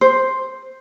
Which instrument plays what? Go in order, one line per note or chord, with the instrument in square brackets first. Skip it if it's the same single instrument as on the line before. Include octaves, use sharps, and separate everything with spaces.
[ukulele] C5